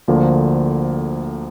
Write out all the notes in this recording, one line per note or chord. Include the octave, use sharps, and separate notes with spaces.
D2 D3 F3 A#3